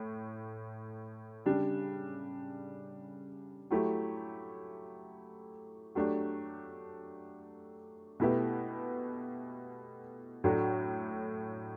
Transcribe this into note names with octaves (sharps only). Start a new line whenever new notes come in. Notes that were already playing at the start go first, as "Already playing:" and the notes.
Already playing: A2
C#3 G3 D4 G4
F#3 A3 E4 G4
F#3 A3 D4 G4
B2 A3 E4 G4 B4
A2 F#3 A3 D4 F#4